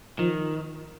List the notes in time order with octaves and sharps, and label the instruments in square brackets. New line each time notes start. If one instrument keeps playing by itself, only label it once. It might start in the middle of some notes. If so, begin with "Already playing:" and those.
[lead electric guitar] D#3 [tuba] F3